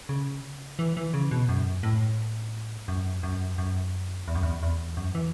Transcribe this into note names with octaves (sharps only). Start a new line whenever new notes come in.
C#3
E3
E3
C#3
B2
F#2
A2
F#2
F#2
F#2
E2
F#2
E2
E2
F#2
E3